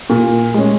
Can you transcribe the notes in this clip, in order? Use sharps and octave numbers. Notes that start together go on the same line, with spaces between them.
A#2
G#3 C#4